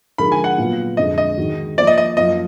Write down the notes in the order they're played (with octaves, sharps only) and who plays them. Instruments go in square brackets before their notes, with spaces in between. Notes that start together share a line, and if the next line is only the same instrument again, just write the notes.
[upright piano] D3 F3 G#3 D#4 A#4 [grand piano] B5
[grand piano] G#5
F#5
[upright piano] A#2 F#3 B3 F4
[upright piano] F2 D3 G#3 [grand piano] D#5
[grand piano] D#5
[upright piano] D#3 G#3 D#4 F#4
[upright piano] F3 A#3 F4 [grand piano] D5
[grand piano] D#5
D#5
[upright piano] F#2 F3 A#3 F4 [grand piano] D#5